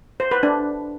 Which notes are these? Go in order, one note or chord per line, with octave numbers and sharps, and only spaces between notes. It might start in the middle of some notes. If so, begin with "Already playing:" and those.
C5
B4
D4